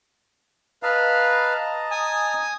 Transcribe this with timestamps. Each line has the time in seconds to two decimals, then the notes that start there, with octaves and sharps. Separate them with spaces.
0.83 B4 D#5 F5 A5 A#5
1.91 G#5 D#6